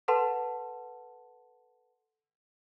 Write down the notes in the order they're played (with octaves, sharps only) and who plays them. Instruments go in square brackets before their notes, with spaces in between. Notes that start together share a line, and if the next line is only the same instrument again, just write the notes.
[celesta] A4 B4 F#5 A5 C6